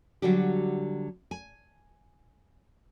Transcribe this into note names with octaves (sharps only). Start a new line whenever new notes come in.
D3 F#3 G3 F#4 G4
G#5